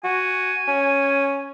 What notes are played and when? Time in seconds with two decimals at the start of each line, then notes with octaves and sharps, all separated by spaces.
0.04 F#4 G#5
0.68 C#4